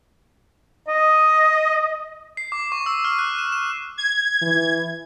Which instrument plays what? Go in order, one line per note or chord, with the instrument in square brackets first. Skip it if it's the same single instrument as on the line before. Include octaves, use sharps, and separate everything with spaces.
[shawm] D#5
[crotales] C7
D6
C#6
E6
F6
F#6
E7
E7
[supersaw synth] G#6
[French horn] E3